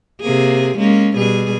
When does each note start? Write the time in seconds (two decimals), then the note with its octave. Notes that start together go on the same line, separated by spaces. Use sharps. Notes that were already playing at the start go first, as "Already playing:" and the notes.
0.21 C3 A#3 G#4
0.77 G#3 A#3 C#4
1.17 B2 G3 G#4